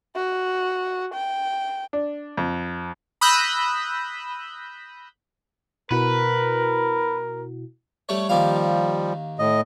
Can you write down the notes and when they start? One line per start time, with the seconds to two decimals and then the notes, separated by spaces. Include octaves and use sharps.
0.16 F#4
1.14 G5
1.93 D4
2.37 F2
3.21 B5 D#6 E6 F#6 G6 A#6
5.91 B2 E4 F#4 A#4 B4
8.09 G3 A3 C#5
8.29 D#2 F3 G3 A#3 F5
9.39 A2 D#5